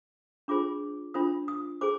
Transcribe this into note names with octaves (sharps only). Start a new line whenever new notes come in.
D4 F4 G#4 C5 D6
D4 F4 C5 D#6
D#6
G#4 C5 D6